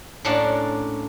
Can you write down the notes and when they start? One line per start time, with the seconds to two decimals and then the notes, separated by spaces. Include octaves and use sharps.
0.25 A2 A#3 C#4 D4 F#5 A5